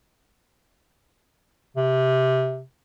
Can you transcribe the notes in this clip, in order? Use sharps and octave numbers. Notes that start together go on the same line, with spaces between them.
C3